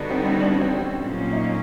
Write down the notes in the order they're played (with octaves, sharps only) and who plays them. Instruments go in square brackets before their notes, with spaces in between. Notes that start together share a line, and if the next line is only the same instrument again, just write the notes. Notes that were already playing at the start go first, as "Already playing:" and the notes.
Already playing: [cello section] D3 G3 B3 D#4 F#4
[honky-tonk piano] C4
C#4
D4
C#4
C4
[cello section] A#2 F#3 A#3 C#4
[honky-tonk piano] D#4